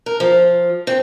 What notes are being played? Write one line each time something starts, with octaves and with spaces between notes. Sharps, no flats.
A#4
F3
C4